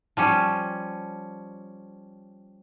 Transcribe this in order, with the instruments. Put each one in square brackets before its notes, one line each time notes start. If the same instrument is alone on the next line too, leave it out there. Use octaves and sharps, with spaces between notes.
[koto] F3 G3 C#4